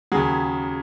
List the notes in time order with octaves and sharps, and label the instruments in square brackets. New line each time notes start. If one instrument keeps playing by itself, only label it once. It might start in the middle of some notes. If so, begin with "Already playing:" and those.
[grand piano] D#2 C#3 F#3 G#4